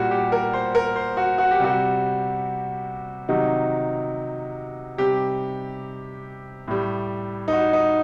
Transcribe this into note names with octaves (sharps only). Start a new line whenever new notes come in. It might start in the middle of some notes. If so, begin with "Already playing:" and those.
Already playing: A#2 G3 F#4
G4
A#4
C5
A#4
C5
F#4
F#4
G4
C3 G3 F#4
C3 D#3 F#3 D#4
C3 G3 G4
A2 G3
D#4
F#4
D#4